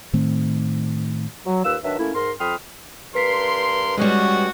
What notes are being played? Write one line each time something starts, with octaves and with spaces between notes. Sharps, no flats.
A2 D#3 A3 C4
F#3
D#2 F4 B4 E6
D#3 F#3 D4 B4 E5
A3 A#3 C#4 E4
G#2 A#4 C6
F2 G5 B5 C6 D#6 F6
G2 A#4 B4 C6 B6 C7
B2 G3 G#3 C#4 F#4